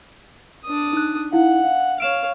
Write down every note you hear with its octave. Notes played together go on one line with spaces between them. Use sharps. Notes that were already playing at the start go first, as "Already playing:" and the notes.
D4 D#6
D#4 F#6
D#4 E4 F5 F#5
F5
C#5 F5 D7 E7